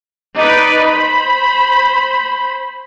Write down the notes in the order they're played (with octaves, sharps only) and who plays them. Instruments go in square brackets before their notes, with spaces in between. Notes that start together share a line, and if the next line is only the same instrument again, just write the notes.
[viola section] D#4 B4 D5
C5 B5